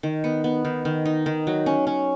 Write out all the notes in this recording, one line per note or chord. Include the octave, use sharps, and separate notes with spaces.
D#3
B3
B3
D#3
D#3
D#4
D#3
F#3
C#4
C#4